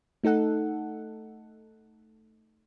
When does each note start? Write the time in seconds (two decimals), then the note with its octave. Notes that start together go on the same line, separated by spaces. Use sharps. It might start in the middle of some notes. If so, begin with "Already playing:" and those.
0.23 A3 D#4 A4 F#5